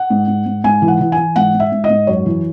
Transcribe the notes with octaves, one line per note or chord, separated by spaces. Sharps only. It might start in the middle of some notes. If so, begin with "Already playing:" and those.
Already playing: F#5
G#2
G#2
G#2
G#2 G#5
E3
F#5
E3
G#5
E3
G#2 F#5
G#2
E5
G#2
D#5
G#2
F#2 C#5
E3